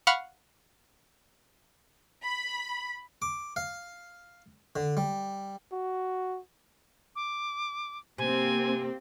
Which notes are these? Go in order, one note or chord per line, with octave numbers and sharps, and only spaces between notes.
F5 F#5 B5 C#6 F6
B5
D6
F5
D3
G3
F#4
D6
C3 A#3 C4 G#5